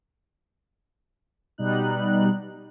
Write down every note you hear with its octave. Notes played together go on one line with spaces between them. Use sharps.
B2 G3 D#4 F#6